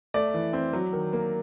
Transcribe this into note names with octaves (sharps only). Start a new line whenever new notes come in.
A3 D5
E3
C4
F#3
D#3
A#3